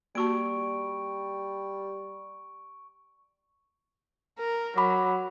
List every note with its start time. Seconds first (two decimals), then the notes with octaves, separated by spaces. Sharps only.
0.15 G3 A#3 F#4 A5 C#6 D7
4.39 A#4
4.77 F#3 B5 D6